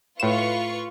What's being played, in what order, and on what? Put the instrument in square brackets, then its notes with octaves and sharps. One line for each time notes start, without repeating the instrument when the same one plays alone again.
[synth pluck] A2 E7 [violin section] F4 B4 C#6